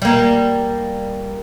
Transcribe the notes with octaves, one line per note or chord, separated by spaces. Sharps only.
G3 A#3